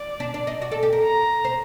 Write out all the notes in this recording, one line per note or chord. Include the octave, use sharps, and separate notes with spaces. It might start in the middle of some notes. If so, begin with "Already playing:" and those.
Already playing: D5
D4
D4
D#4
F#4
A4
G4
A#4
A#5
C5